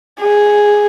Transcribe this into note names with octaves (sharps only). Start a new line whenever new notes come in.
G#4